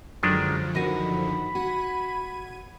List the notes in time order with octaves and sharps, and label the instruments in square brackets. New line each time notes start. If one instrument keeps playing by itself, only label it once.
[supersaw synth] F#2 D3 F3 [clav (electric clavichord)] D#3 G#3 D4 [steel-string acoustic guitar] F#3
[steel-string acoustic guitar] D#3 F#4 [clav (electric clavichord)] D#5 [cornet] B5
[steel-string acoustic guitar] F#4 [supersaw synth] G#6 D#7